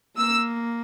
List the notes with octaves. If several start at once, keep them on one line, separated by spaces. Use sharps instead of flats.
A#3 E6